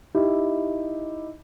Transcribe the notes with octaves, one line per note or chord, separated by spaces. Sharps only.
D#4 E4 G4